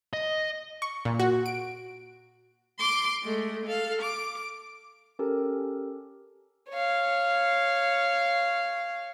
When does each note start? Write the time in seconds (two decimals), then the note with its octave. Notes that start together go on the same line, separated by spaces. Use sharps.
0.13 D#5
0.82 C#6
1.05 A#2
1.19 F#4
1.46 D7
2.79 C6 D6
3.23 G#3 A3
3.65 A4 F5
4.01 D6
5.19 C#4 G4 A4 A#4
6.70 C#5 F5